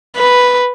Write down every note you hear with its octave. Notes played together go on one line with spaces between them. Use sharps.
B4